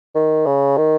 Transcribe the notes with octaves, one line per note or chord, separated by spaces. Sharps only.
D#3
C#3
D#3